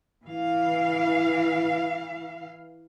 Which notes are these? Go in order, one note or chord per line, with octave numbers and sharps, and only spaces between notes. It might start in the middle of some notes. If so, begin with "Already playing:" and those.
E3 F5